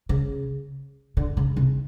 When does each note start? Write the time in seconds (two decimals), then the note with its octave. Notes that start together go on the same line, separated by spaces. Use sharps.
0.09 C#3
1.17 D3
1.37 C#3
1.57 C3